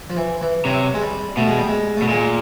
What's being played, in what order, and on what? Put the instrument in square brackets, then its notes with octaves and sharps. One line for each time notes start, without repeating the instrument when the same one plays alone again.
[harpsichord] F3
E3
E3
[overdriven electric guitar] C3 [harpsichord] F#3
[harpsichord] G#3
G3
[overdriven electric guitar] B2 [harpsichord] A3
[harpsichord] G#3
G3
G#3
[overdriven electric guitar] B2 [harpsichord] A3
[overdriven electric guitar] A#2 [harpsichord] G#3